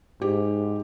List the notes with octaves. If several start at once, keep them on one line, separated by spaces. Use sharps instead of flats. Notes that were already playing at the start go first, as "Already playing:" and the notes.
G#2 G4